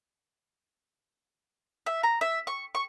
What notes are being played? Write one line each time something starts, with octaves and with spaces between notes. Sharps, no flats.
E5
A#5
E5
C#6
C#6